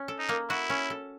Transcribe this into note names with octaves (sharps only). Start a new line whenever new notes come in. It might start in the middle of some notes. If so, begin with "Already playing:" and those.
Already playing: C#4
A4
D#4
A#3
E4 F#4
C#4
A4